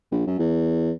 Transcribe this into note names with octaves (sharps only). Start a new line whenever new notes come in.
A#1
F#2
E2